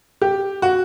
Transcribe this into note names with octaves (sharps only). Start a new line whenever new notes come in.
G4
F#4